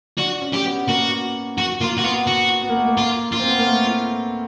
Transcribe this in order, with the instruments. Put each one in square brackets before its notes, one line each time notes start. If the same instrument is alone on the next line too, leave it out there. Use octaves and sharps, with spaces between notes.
[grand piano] D4 [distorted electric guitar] F#4
[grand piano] C#4
[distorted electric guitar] G4
[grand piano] B3
[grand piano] A#3 [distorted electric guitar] F#4
[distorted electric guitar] F#4
[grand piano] A#3 [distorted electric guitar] F4
[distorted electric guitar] F#4
[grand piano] B3 [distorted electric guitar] F4
[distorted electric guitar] F#4
[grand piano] B3
A#3
A3
A#3
[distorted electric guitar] F4
F4
[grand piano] C4
B3
A#3
A3